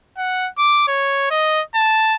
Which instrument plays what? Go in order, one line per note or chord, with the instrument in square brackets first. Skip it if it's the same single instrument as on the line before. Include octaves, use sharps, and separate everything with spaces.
[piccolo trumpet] F#5
D6
C#5
D#5
A5